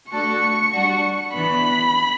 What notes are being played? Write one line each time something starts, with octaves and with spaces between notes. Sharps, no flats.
A3 D4 F#4 A4 D5 C#6
G3 D4 F#4
E3 B3 D4 B5